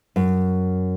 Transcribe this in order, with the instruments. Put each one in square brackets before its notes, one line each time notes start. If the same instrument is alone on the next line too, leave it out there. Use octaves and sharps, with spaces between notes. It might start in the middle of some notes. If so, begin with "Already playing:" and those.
[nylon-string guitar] F#2